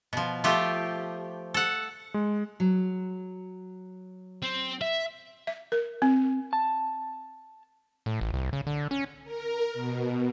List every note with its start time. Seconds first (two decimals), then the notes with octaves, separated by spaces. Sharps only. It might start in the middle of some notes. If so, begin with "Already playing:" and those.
0.13 B2 F3
0.44 F3 A3 F4 G4
1.54 A4 F#5
2.14 G#3
2.60 F#3
4.43 C4
4.82 E5
5.47 E5
5.72 A#4
6.02 C4
6.53 A5
8.06 A2
8.21 A1
8.34 C2
8.53 C#3
8.67 D3
8.91 C#4
9.25 A#4
9.73 B2